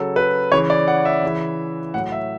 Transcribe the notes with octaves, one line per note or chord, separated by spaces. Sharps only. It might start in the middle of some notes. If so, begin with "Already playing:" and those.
Already playing: C#3 F#3 A4
B4
C#3 E3 C#5
D5
F#5
E5
C#3 E3
A2 F#3 F#5
E5